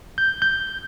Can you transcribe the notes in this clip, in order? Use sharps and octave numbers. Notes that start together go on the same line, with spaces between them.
G6
G6